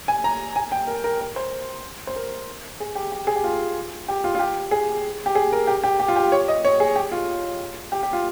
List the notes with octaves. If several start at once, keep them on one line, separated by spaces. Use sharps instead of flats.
G#5
A#5
G#5
G5
A#4
A#4
A#4
C5
C5
A#4
G#4
G4
G4
G#4
G4
F4
G4
F4
F4
G4
G#4
G4
G#4
A#4
G4
G4
G4
F4
G4
C#5
D#5
C#5
G#4
G4
F4
G4
G4
F4